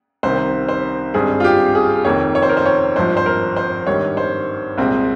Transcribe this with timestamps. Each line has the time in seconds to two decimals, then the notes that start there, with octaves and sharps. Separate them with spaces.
0.23 C2 C3 D#3 C5
0.69 C5
1.14 G#1 G2 G3 C4 G#4
1.40 F4
1.44 G4
1.75 G#4
2.04 F1 F2 D#3 A#3 C#5
2.35 C#5
2.42 C5
2.49 A#4
2.57 C5
2.66 C#5
2.96 G#1 G2 F3 C5
3.17 C5
3.26 A#4
3.57 C5
3.87 G#1 G2 D#3 G3 C#5
4.17 C5
4.78 C2 A#2 G#3 C4